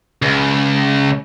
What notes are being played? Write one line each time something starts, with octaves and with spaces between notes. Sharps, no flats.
C#2